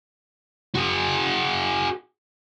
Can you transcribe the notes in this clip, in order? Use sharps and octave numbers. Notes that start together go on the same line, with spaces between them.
F#4 G#4